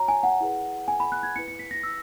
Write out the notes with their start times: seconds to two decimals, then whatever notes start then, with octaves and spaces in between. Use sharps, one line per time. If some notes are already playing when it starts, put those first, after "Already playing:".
Already playing: F#4 C#5 A#5
0.08 G#5
0.23 F#5
0.40 E4 G#4 B4
0.88 G#5
1.00 B5
1.12 F#6
1.23 G#6
1.36 E4 B4 C#7
1.48 C#7
1.59 B6
1.71 A#6
1.83 E6